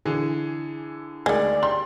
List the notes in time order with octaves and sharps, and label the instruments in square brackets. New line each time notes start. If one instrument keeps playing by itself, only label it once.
[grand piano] D3 E3 G#4
[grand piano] D2 [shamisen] D#3 G#3 [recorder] D5
[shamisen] G3 [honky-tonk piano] C6